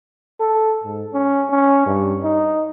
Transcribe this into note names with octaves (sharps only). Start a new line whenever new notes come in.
A4
G#2
C#4
C#4
G2
D#4